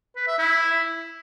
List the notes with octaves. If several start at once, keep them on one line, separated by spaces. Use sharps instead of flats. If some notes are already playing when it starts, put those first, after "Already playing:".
B4
E5
E4